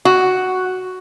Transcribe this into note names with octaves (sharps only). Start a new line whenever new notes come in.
F#4